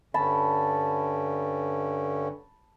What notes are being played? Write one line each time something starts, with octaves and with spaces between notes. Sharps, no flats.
G2 D3 C#4 A5 B5